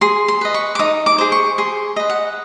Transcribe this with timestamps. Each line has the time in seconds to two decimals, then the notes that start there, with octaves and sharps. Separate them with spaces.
0.01 G#4 C6
0.28 C6
0.41 B4 D#5
0.54 C#6
0.75 D6
0.79 D#4 D#6
1.06 D6
1.18 G#4 C5
1.32 C#6
1.58 G#4 C6
1.96 B4 D#5
2.10 F#5